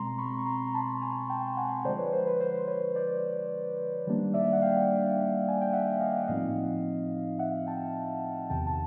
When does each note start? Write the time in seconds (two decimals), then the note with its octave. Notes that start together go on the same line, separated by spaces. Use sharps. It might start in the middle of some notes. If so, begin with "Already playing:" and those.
Already playing: B2 G#3 C4 A#5 C6
0.18 B5 C#6
0.39 C#6
0.46 A#5 C6
0.67 A#5
0.75 A5 B5
1.01 G#5 A#5
1.30 G5 A5
1.57 F#5 G#5
1.84 D3 F3 G#3 C5 D5
1.98 B4 C#5
2.12 C5
2.27 B4
2.41 C5
2.67 B4 C#5
2.96 C5 D5
4.07 D#3 G3 A#3 D4
4.34 D5 E5
4.53 F#5
4.62 F5 G5
5.48 G#5
5.61 G5
5.73 E5 F#5
6.00 D#5 F5
6.24 F#5
6.28 A2 F3 A3 C4 D#4 D#5 F5
7.39 E5 F#5
7.67 G5 A5
8.50 E2 C3 D#3 G5 A5
8.67 A5